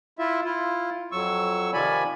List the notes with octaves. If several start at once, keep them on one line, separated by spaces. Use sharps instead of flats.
E4 F4 E5
E4 F4
F2 F#3 C#6 E6
C3 D#3 F3 D5 G#5 B5